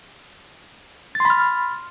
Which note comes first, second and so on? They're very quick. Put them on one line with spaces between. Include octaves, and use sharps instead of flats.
A6 C6 B5 F6